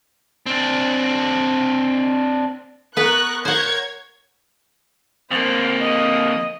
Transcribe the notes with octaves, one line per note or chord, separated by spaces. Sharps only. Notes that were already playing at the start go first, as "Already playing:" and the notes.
C4 D4
B3 A#4 B4 C#6 F#6
A#4 C5 C#5 F#5 G#6
F2 A#3 C5
D#5